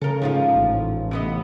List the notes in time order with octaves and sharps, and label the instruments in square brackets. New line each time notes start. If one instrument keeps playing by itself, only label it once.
[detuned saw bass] C#3 [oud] A4 A#4
[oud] G#2 F3 F4
[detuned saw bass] A1
[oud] C3 B3 D#5